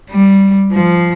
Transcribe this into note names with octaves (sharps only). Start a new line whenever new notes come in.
G3
F3